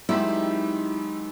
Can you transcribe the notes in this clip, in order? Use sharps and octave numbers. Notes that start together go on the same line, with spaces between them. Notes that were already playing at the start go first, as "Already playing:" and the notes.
D#3 F#3 G#3 C4 E4 G4 B5